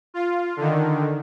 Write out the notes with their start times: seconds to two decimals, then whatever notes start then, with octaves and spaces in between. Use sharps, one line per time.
0.14 F4
0.57 D3 D#3